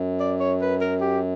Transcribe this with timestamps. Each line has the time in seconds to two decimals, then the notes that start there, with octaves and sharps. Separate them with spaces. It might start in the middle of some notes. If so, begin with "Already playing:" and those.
Already playing: F#2
0.20 D5
0.40 C#5
0.61 B4
0.81 A#4
1.01 G4